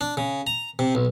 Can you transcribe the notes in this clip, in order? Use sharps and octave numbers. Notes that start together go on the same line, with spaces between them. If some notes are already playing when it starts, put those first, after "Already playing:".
D4
C#3
A#5
C3
B1